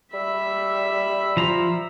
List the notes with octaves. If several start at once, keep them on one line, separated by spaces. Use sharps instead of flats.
G3 E5 B5
F3 A#5